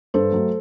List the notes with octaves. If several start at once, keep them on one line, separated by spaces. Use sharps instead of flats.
G2 A4 C5
F#3 A3